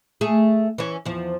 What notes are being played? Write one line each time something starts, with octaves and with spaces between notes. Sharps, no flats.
A3 G#4
E3 C#4
E2 F3